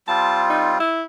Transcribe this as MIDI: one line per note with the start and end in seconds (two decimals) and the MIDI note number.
0.08 0.78 55
0.08 0.78 60
0.08 0.78 65
0.08 0.44 81
0.50 0.73 63
0.80 1.03 64